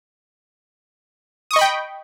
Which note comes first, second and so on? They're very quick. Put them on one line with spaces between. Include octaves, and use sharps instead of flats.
D#6 C#6 D#5 B5 G5